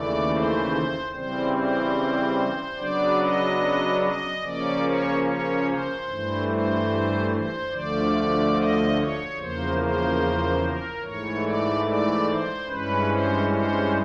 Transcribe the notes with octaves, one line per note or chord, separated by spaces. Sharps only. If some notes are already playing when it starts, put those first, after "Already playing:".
Already playing: D#2 C#3 E3 A3 D5
C5
C#3 E3 G3 C4 C5
C5
C#3 F#3 B3 D4 D5
D#5
D#5
C#3 F3 A#3 C#4 D5
C#5
C#5
C5
G2 E3 A3
C5
C5
D2 D3 F3 A3 D5
D#5
C#5
E2 C#3 F3 A#3 C5
C5
A#4
G#2 E3 A3 C#5
D5
D5
C5
G2 E3 G#3 C#4 B4
C5
C5